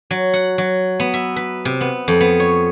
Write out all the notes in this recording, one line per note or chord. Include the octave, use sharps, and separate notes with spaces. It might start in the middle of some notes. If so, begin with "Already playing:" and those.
F#3
F#5
F#3
B3
E5
B4
C3
B3
F2
B3
C#5